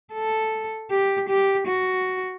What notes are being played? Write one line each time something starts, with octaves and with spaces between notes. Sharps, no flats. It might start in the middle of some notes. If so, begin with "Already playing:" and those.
A4
G4
G4
F#4